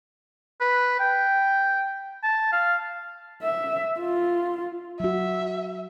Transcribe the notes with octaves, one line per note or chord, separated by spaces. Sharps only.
B4
G5
A5
F5
E5
F4
F#3 F#4 E5